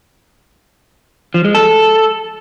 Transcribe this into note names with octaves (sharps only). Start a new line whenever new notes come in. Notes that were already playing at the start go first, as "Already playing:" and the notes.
F3
G#3
A4